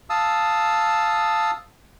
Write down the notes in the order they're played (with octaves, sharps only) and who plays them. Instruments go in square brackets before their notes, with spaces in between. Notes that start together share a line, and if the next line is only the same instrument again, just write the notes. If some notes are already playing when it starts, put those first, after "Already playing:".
[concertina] F5 A5 D#6 E6